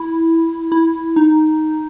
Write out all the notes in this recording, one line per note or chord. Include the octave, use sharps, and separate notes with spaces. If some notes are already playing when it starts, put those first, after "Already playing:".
Already playing: E4
E4
D#4